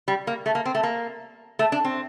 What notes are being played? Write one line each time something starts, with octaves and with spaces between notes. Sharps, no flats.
G3
A#3
A3
A#3
C4
A3
A#3
A3
D4
C4